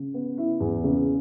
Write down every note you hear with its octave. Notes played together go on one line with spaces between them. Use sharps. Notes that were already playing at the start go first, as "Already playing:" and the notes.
Already playing: C#3
B3
E4
E2
C#3